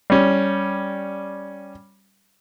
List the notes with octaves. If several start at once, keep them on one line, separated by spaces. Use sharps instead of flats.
G3 C#4